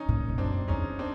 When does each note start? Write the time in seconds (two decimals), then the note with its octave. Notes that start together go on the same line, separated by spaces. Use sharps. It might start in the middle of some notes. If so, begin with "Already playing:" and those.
Already playing: C#4 D#4
0.08 A#2
0.28 F2
0.38 F#2 C4 D4
0.68 E2 C#4 D#4
0.99 C4 D4